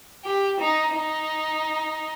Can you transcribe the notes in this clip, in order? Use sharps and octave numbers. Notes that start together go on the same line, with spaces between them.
G4
D#4
D#4